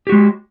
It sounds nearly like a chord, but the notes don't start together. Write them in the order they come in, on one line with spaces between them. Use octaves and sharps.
G4 F#4 G#3